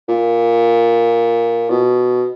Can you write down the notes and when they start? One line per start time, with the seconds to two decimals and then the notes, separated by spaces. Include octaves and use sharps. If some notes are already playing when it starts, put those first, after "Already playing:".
0.09 A#2
1.70 B2